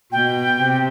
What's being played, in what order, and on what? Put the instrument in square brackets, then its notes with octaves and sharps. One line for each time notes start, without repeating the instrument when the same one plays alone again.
[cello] B2 [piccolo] G5
[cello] C3